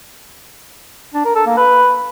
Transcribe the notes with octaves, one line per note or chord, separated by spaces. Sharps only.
D4
A#4
A4
A#3
B4